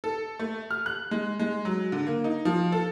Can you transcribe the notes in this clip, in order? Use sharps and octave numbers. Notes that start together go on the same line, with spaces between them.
A4
A3
F6
F#6
G#3
G#3
F#3
D3
A#3
D#4
F3
A4